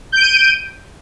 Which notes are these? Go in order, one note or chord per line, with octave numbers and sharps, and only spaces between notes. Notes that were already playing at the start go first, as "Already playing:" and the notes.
G6 D7 D#7